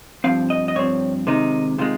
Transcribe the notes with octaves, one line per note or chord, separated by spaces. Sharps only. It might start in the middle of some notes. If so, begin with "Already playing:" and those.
G2 F3 C4 F5
D#5
D#5
G2 F3 C4 C#5
C3 D#3 G#3 D#4
C3 D#3 G#3 F4